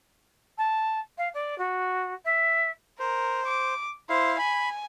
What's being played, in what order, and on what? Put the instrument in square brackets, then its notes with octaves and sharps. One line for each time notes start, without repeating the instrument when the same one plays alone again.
[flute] A5
F5
D5
F#4
E5
[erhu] A#4 [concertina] C5
[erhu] D6
[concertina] E4 F5 [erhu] C5
[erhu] G#5 [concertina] B5